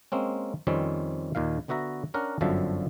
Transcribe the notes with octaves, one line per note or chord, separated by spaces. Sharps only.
G#3 A#3 C4 C#4
F2 D#3 G3 C4 C#4
D#2 A#2 D#3 F5
D3 B3 F#4 E5 A#5
C#4 D4 A#4 F#5
G1 F#2 D3 F3 E5 A5